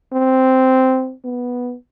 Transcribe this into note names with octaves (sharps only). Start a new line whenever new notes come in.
C4
B3